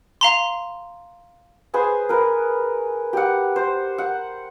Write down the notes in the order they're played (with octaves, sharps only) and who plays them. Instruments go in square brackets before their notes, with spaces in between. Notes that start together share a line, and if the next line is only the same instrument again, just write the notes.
[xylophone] F5 A#5 C6
[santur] G#4 B4 C5 G#5
A#4 B4
G4 F#5
C5
F#5